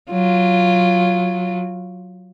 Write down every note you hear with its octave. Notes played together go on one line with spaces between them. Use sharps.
F#3 F4